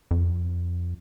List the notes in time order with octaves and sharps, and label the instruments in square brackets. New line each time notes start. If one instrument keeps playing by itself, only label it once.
[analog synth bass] F2